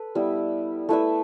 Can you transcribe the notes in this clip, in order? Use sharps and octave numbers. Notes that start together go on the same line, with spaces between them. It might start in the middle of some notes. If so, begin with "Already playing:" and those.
Already playing: A4 B4
G3 B3 E4
A3 E4 B4 E5